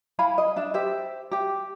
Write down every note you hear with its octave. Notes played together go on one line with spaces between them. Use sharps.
E4 F5 G#5 B5
D#5
D4 E5
G4 C5 E5 G5
G4 G5